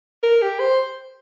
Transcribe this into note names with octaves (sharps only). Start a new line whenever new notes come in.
A#4
G4
C5